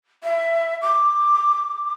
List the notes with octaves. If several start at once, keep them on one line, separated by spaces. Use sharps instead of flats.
E5
D6